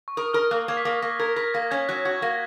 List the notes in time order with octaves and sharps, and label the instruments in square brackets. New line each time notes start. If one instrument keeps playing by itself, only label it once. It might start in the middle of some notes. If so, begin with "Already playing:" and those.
[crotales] C#6
[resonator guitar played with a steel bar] A#4 [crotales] D#6
[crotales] D#6
[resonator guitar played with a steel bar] A#4 [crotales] F6
[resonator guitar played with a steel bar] A#3 [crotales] F#6
[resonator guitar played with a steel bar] A#3 [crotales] G#6
[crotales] B6
[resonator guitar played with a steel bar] A#3 [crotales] A#6
[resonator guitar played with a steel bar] A#3 [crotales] A#6
[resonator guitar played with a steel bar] A#4 [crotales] G#6
[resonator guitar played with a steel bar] A#4 [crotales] B6
[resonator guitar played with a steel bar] A#3 [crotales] A#6
[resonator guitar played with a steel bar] C#4 [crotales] G#6
[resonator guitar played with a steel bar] F#3 [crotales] F#6
[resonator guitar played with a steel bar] F#4 [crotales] G#6
[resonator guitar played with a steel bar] A#3 [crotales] A#6